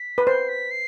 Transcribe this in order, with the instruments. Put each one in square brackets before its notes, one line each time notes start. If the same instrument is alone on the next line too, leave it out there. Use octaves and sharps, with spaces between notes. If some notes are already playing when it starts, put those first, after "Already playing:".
Already playing: [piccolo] B6
[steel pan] B4
[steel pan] C5 [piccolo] C7
[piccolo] B6
C7